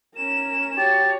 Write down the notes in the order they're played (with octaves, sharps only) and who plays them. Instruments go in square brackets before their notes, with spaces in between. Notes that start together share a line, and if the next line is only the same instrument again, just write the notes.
[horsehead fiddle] C#4 A#4 [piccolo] E7
[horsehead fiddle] F#4 C#5 [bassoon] G4 [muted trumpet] A5